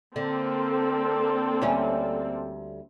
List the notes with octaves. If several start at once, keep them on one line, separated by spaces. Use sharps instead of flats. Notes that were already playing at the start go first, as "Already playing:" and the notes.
D3 A#3 C4 A4
D2 G3 C#4